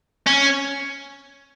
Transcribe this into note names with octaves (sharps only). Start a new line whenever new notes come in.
C#4